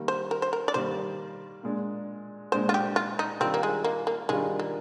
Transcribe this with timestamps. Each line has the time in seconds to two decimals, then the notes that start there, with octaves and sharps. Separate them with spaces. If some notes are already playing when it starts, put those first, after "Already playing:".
Already playing: D#3 G3 A#3
0.08 C5
0.31 A#4
0.42 C5
0.53 A#4
0.68 D5
0.74 D#3 G3 A#3 C5
1.63 A#2 G#3 D4
2.52 A#2 G#3 D4 C5
2.69 F4
2.74 G4
2.96 F4
3.19 D#4
3.40 D#3 G3 C4 D4 F4 A#4
3.54 A#3
3.63 G#3
3.84 A#3
4.07 A#3
4.29 D#3 G3 G#3 D4 F4 A#4
4.59 A#3